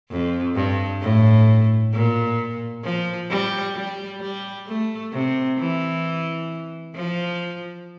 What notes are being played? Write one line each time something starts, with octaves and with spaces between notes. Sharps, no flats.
F2
G2
A2
A#2
F3
G3
G3
G3
A3
C3
E3
F3